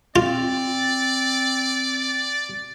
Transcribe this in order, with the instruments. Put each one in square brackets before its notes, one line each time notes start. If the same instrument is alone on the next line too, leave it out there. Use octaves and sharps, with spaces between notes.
[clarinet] C4 [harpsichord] F4 [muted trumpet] D5